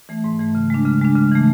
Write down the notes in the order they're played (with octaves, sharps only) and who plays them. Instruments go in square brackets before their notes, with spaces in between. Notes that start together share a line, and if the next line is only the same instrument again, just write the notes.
[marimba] E3 A3
G#2
E3 A3
C#3
G#3 D4
C#3
G#3 D4
C#3
E3 A3